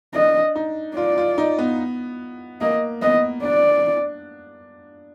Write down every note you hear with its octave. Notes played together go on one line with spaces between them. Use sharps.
D4 D#5
D#4
F4 D5
F4
D#4
B3
A#3 D#5
B3 D#5
D4 D5